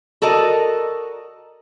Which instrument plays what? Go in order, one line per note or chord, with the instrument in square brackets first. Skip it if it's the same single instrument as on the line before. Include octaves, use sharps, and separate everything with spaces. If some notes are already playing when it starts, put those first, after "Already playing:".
[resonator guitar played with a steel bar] F#4 A4 A#4 D5 D#5